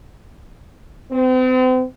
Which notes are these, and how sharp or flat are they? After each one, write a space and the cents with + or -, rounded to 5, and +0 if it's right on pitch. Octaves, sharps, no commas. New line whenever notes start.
C4 -40